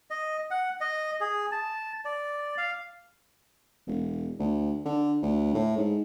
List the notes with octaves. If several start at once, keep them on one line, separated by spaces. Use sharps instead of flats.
D#5
F#5
D#5
G#4
A5
D5
F5
E1
D2
D3
D2
A2
G#2